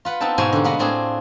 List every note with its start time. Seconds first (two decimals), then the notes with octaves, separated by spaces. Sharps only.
0.05 F4 B4 F#5
0.20 B3 C4 D#4 A4 G5 A5
0.38 G#2 B2 C5 G5 G#5
0.53 D3 G3
0.64 G#3 A#3 B3 F#5
0.79 A2 C4 D4 F4 G#4